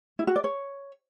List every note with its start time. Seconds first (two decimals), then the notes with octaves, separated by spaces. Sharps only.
0.19 E4
0.27 F#4
0.36 D5
0.44 C#5